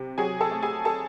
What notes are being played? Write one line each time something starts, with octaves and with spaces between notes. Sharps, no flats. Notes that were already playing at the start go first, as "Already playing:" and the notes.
Already playing: C3
F#3 G#4 G#5
A4 A5
A3
G#4 G#5
A4 A5